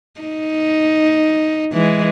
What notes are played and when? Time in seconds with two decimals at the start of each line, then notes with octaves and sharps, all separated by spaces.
0.21 D#4
1.73 E3 G#3